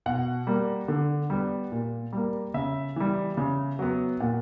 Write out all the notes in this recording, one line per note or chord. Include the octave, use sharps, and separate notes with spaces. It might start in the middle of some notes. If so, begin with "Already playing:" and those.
B2 F#5
G3 A#3
D3
G3 B3
A#2
G3 A#3
C#3 E5
E3 G3
C#3
F#3 B3
A#2 F#5